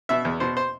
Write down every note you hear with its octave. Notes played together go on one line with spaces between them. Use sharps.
B2 E5
E2
B2 C5
C5